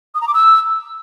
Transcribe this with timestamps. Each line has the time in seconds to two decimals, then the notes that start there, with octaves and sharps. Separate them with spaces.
0.15 D#6
0.21 A#5
0.28 D6
0.34 E6